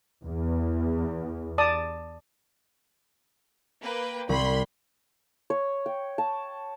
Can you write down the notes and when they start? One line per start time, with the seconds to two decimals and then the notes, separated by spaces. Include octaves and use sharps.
0.24 E2
1.58 D5 A5 D#6
3.82 A#3 B4 G5
4.29 C2 B5 C6
5.50 C#5
5.86 G5
6.18 A5